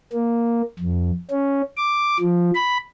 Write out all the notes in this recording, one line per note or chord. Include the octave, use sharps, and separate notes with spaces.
A#3
F2
C#4
D6
F3
B5